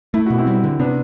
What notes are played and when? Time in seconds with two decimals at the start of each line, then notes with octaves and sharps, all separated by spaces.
0.14 A3 E4
0.26 B2 F#4
0.38 C4 E4
0.47 G3
0.64 D3
0.79 C3 B3 D4